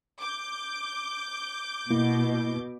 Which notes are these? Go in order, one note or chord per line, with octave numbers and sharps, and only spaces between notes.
D6 G6
B2 A#3 E4